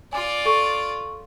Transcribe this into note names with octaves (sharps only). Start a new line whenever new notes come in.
F4 D5 G#5 D6
A4 C#6